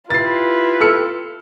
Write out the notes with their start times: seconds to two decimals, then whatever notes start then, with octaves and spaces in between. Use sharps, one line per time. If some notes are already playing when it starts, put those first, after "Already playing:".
0.10 E4 F4 G4 B4 A6 C7
0.81 A4 E6 F6 C#7